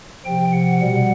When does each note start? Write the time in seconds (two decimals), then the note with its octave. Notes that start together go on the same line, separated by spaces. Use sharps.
0.25 C3 F3 G5
0.52 F#5
0.81 B2 G3 F#5